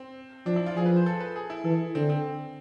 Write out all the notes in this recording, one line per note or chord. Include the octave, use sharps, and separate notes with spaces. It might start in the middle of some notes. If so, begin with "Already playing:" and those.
Already playing: C4
F3 D4
E4
F4
F3 G#4
B4
C5
A4
B4
G#4
E4
E3 A4
D3 C4
C4